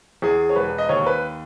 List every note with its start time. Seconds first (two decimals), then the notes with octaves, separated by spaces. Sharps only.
0.22 E2 G#4
0.49 C#5
0.56 E1 B4
0.78 D#5
0.89 D#2 C#5
1.06 B4